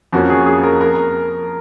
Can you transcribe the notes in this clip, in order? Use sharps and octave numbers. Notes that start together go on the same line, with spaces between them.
F2 F3 A#3 C#4 F#4
G#4
G#4
A#4
A#4